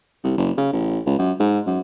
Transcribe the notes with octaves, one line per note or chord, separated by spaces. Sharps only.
C2
F#1
C#3
A1
C#2
F#2
G#2
F#2